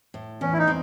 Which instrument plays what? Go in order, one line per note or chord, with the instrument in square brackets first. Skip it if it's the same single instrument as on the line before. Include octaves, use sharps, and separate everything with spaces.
[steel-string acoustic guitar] A2
[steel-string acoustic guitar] E2 [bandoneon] C#4
[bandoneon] E4
D#4
[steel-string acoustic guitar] C4